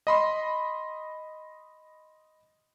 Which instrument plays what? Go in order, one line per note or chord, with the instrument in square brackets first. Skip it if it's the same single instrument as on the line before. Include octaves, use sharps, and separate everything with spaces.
[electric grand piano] D#5 B5 C6